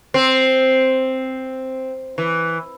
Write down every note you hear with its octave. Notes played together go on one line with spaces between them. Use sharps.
C4
E3